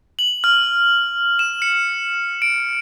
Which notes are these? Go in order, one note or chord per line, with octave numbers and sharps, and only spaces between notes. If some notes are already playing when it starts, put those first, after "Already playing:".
F#7
F6
E7
C#7
D7